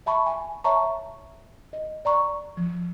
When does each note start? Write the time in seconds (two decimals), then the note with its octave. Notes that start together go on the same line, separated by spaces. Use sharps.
0.06 E5 A5 B5 C#6
0.26 G#5
0.64 C#5 E5 A5 A#5 C#6
1.73 D#5
2.05 D5 A#5 C#6
2.57 F3